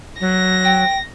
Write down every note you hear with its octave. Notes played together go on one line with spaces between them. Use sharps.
F#3 A#6
G5